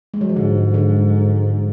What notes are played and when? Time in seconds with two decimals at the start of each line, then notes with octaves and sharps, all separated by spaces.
0.14 G#3
0.21 F#3
0.29 F3
0.36 G#2 D3
0.74 D3